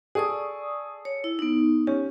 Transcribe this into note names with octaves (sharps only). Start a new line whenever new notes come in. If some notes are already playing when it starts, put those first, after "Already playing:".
G#4 A4 D5 C#6 D#6
C#5
E4
B3 D#4
C#4 G4